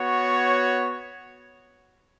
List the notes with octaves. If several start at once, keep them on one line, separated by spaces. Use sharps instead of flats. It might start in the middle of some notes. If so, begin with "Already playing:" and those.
Already playing: B3 F#4 C#5